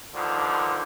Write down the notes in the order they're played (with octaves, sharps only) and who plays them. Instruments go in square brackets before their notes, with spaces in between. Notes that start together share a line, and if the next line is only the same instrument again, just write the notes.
[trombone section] G2 D3 D#3 F3